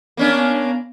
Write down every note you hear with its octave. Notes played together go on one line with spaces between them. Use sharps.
A#3 B3 C#4 D4 F5